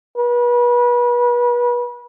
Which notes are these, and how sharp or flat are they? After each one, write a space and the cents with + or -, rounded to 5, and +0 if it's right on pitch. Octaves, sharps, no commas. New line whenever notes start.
B4 -30